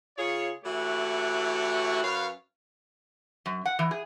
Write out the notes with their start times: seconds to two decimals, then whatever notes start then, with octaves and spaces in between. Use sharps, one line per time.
0.17 C#3 F4 G#4 C#5
0.65 E3 A3 E4 F#4 G4 C#5
2.03 F#2 B4 C#5 F5
3.46 F#2
3.66 F#5
3.79 E3
3.91 G#4